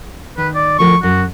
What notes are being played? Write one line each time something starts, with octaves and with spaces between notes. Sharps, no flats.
D#3 B4
D5
D2 F3 A#4 C#6
F#2 F#4